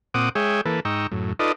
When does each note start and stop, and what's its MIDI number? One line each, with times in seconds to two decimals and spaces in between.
0.14 0.29 46
0.14 0.29 60
0.14 0.29 78
0.14 0.29 86
0.14 0.29 87
0.35 0.61 56
0.35 0.61 68
0.35 0.61 73
0.35 0.61 76
0.35 0.61 79
0.66 0.80 52
0.66 0.80 58
0.66 0.80 69
0.66 0.80 71
0.85 1.07 44
0.85 1.07 63
0.85 1.07 79
0.85 1.07 82
0.85 1.07 85
0.85 1.07 88
1.12 1.33 42
1.12 1.33 45
1.39 1.52 63
1.39 1.52 65
1.39 1.52 69
1.39 1.52 71
1.39 1.52 74
1.39 1.52 75